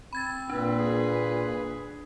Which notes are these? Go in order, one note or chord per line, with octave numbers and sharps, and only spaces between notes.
C4 B5 G#6 A6
A#2 A#3 D4 B4
G#4